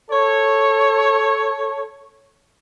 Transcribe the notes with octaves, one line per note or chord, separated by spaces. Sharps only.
A4 C#5